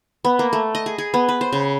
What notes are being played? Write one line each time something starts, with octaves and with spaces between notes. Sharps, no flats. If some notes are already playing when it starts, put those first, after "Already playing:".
B3
A#3
A3
D#5
G#4
G#4
B3
B4
C5
C#3